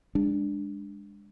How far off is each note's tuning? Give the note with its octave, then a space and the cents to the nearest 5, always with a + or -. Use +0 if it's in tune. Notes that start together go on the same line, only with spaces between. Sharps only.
G#3 -25 D4 +0